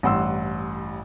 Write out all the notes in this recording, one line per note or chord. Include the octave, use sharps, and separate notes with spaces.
A1 G2 F#5 C6 E6